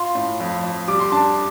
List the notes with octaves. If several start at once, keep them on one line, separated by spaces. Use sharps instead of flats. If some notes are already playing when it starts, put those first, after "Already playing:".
Already playing: F4 C6
A2
F2
F2
G3 D6
C6
D4 A5